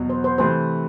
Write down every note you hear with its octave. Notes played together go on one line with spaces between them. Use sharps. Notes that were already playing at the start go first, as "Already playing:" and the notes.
Already playing: E2 B2 F#3
C5
C5
C3 E3 A3 C5